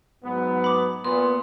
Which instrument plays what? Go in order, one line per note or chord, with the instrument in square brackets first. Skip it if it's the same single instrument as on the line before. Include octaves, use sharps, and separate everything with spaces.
[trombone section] G#2 F#3 B3
[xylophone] B5 D6
[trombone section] A#2 [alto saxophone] B3 [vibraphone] C6